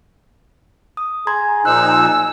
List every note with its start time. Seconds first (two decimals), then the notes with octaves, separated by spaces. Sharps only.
0.97 D#6
1.27 G#4 A#5 C6 G#6
1.65 A#2 F3 D#4 E6 F#6